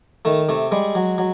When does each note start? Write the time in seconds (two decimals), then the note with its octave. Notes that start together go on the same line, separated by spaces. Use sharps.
0.25 D#3 A3
0.49 C3 A3
0.72 G3 G#3
0.95 F#3
1.18 F#3